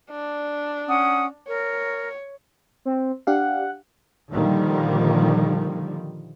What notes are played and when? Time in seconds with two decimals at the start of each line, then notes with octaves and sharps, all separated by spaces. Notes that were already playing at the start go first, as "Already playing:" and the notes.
0.10 D4
0.89 C#4 F#5 D#6
1.48 A#4 C#5
2.85 C4
3.27 D4 G4 F5 F#5
4.33 A#2 D3 D#3 F3 G3